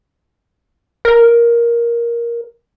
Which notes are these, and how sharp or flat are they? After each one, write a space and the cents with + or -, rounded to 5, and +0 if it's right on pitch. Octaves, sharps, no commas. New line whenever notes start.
A#4 +10